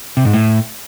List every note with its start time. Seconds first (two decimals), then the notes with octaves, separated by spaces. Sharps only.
0.17 C3
0.25 G#2
0.33 A2